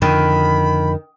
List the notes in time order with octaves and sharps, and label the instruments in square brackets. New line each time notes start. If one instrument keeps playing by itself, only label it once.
[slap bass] F2 D3 [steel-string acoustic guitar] D#3 [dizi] B5